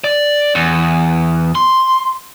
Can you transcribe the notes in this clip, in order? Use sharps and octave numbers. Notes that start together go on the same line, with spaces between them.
D5
E2
C6